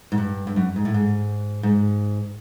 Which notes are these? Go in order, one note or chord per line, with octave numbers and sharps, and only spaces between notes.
G#2
G2
G2
F#2
G#2
A2
G#2
G#2